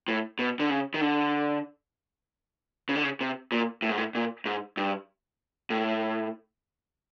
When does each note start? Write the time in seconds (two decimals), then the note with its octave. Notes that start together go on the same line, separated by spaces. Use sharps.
0.08 A2
0.39 B2
0.59 D3
0.70 C#3
0.94 D#3
1.01 D3
2.89 C#3
2.96 D3
3.03 C#3
3.21 C3
3.52 A#2
3.82 A2
3.89 G#2
3.98 A2
4.15 A#2
4.45 G#2
4.77 G2
5.70 A2